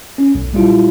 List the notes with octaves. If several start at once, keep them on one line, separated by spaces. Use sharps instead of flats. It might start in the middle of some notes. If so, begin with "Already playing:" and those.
C#4
B1
A#2 F#3 G3 E4 F4